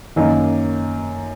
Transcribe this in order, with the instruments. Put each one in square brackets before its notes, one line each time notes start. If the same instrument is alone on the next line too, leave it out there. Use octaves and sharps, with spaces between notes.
[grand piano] F#2 D#3 A#3 D#4